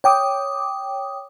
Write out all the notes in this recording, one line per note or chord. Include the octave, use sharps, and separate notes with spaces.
C#5 G5 D6 D#6